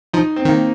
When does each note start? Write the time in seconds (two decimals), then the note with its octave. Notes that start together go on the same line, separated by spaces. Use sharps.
0.13 F3 D#4
0.36 C4
0.45 D#3 A#3